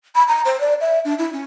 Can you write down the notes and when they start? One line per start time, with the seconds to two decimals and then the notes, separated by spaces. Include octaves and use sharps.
0.15 B5
0.28 A#5
0.45 C5
0.61 D5
0.81 E5
1.05 D4
1.18 E4
1.33 C#4